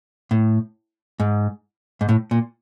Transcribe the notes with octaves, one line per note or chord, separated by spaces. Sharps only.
A2
G#2
G#2
A2
A#2